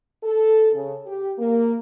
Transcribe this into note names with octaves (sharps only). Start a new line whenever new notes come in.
A4
C#3
G4
A#3